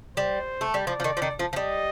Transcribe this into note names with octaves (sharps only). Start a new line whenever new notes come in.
G3 C5
A3
G3
F3 D5
F3
D#3
F3
D#3
F3
F3
G3 D#5